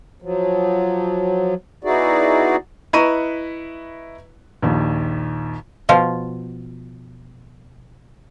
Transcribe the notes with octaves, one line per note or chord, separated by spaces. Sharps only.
F3 F#3
B3 D#4 E4 F#4 G#4 D5
E4 B4 D#5 A#5 C#6 D#7
A#1 D#2
B2 F3 F4